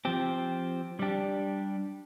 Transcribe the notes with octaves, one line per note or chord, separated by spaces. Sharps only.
F3 C4 G4
G3 D4 G4